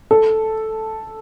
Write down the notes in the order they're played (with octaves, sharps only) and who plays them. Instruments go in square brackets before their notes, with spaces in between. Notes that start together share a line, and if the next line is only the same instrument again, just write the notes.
[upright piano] A4